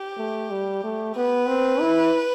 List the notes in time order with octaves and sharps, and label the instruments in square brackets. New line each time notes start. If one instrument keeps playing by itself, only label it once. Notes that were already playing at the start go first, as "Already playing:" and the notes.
Already playing: [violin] G4
[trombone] A3
G3
A3
[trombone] B3 [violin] B4
[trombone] C4
E4